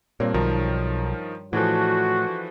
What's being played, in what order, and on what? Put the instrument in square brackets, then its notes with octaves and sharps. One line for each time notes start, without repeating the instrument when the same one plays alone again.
[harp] G2 C#5 [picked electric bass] A#2 [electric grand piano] C4 A#4
[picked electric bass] B1 [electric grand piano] D#3 F3 A#4
[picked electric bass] A2 [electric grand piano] E3 F3 [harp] D4 G#4 A4 [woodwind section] F#4